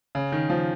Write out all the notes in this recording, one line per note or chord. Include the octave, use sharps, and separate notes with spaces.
C#3
D#3
F3